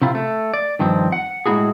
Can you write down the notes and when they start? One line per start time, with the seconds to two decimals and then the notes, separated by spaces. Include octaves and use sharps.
0.02 C3 C4 E4 F4
0.15 A3
0.54 D5
0.79 G2 D#3 F3 C4
1.12 F#5
1.46 A2 G#3 A#3 E4 F#4 G#4